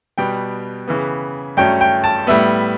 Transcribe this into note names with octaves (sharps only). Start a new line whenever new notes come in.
B2 G3 B3 G5
C#3 E3 B3
G2 F#3 A3 C#4 G5
G5
A5
A2 G3 B3 E5